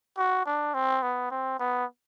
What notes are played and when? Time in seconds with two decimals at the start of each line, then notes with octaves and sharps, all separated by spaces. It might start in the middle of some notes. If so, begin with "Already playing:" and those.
0.17 F#4
0.46 D4
0.74 C4
1.02 B3
1.31 C4
1.59 B3